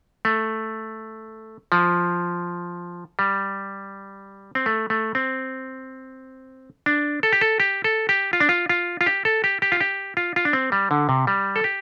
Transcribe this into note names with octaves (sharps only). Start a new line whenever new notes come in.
A3
F3
G3
C4
A3
A3
C4
D4
A4
G4
A4
G4
A4
G4
F4
D4
F4
F4
F4
G4
A4
G4
G4
F4
G4
F4
F4
D4
C4
G3
D3
C3
G3
A4
G4